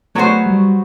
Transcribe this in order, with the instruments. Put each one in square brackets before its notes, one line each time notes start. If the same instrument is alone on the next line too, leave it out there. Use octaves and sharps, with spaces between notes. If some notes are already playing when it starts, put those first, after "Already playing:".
[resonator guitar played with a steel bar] F#3 B3 F#4 C5 [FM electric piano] A3
[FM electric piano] G3